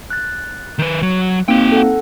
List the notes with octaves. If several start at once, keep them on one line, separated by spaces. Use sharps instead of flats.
F#6 A6
D#3 B4
F#3
A#3 C4 D#4 F#4 G5
A4 F#5